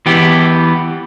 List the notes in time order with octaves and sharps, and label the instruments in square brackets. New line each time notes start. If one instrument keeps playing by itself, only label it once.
[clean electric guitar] E3 B3 G4